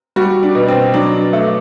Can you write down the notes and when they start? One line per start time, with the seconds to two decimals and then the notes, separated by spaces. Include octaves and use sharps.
0.16 G3 F#4
0.43 D4
0.55 B2
0.68 C4
0.94 F#3 D4
1.33 A3